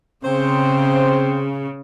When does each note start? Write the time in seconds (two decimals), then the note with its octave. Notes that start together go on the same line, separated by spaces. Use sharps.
0.24 C#3 C4 C5